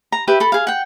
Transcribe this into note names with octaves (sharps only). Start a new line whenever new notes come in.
A#5
G4 B4 E5
A4 B5
G#4 F5
F#5 G5